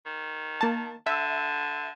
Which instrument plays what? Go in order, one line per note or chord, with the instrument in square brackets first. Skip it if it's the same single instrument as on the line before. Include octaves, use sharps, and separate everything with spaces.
[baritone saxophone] D#3
[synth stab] A#3 A5
[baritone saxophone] D3 [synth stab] E5